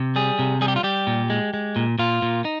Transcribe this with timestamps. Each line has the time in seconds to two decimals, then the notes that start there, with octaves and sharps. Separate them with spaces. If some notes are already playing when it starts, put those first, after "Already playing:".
Already playing: C3
0.16 G3 G#4
0.39 C3
0.61 G3 G#4
0.68 G4
0.76 F4
0.83 G3 G4
1.07 A#2
1.30 G#3
1.54 G#3
1.76 A#2
1.99 A#2 F4
2.22 A#2
2.45 D#4